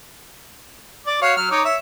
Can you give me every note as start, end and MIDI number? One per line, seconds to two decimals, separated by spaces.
1.07 1.19 74
1.07 1.19 86
1.22 1.34 66
1.22 1.34 73
1.22 1.34 77
1.37 1.49 54
1.37 1.49 89
1.51 1.64 63
1.51 1.64 73
1.51 1.64 86
1.65 1.77 73
1.65 1.77 76